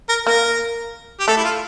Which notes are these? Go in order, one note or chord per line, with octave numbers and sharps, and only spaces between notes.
A#4
A#3 A#4
G4
A3 A4
E4
F4